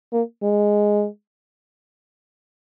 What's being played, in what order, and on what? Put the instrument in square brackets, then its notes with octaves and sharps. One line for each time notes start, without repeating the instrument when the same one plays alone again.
[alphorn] A#3
G#3